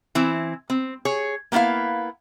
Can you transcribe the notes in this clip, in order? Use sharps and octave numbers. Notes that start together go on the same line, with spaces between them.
E3 C4 E4
C4
G#4 C#5
A#3 B3 C#4 E4 F5